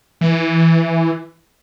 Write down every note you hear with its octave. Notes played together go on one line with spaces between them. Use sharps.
E3